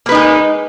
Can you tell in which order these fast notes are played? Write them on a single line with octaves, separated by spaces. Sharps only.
A#3 B4 D#4 G#3